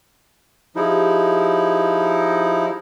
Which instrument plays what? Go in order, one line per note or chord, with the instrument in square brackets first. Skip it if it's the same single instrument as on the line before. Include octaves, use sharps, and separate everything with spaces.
[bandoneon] F3 D#4 E4 [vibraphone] G4 G#4